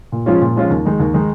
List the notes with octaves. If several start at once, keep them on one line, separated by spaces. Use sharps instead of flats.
A#2
F3 G#3 C#4 F4
A#2
F3 G#3 C#4 F4
D#2
D#3 G#3 D#4
D#2
D#3 G#3 D#4